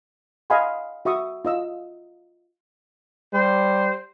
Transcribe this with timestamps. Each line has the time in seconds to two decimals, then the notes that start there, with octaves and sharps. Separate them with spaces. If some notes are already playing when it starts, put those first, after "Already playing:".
0.50 D#5 F5 F#5 G#5 B5 C6
1.05 F#4 E5 C#6 D#6
1.45 F4 D#5 E6
3.33 G3 C5